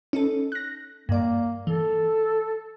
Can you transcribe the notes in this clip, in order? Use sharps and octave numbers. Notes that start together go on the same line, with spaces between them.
C#4 D#4 A4
F#6 A#6
G2 A#3 D5
E3 A4